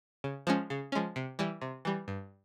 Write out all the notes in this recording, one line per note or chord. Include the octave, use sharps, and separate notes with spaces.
C#3
F3 G#3 C#4
C#3
F3 G#3 C#4
C3
E3 G3
C3
E3 G3
G2